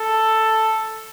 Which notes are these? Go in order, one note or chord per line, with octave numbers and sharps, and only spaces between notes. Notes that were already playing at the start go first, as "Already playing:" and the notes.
Already playing: A4